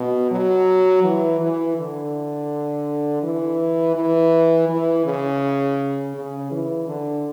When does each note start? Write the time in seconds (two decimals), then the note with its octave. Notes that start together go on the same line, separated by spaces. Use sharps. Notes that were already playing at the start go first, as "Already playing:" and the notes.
Already playing: B2
0.31 F#3
1.04 E3
1.40 E3
1.77 D3
3.23 E3
3.95 E3
4.69 E3
5.05 C#3
6.15 C#3
6.51 E3
6.88 D3